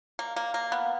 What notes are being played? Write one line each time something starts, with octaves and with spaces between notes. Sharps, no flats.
A#3
A#3
A#3
B3